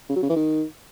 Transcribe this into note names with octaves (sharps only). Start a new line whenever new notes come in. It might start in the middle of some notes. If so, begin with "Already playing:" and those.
C#3
F#3
C#3
E3
D#3